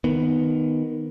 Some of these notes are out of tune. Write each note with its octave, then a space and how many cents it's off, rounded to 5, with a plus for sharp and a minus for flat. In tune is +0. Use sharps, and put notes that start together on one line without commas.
D#3 +0 B3 +0